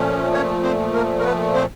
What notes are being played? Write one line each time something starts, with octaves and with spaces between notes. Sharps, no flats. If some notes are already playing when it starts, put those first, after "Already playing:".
Already playing: A#2 F3 A3 C#4
C#4 C#5
C4 C5
A#3 A#4
A#4
B3 B4
C4 C5